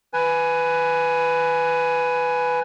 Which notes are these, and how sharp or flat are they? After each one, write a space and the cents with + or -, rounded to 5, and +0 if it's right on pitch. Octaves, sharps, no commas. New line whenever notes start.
B4 +5 G#5 +10